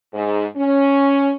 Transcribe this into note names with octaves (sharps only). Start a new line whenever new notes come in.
G#2
C#4